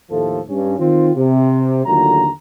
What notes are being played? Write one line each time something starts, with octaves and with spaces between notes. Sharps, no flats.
D#2 A2 F3 A3 A4
G2 C#4
D#3 C4 F4
C3
D#2 D3 F#3 A3 F4 A#5